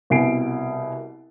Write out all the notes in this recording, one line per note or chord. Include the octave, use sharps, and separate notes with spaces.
C2 B2 G#5 C7 D7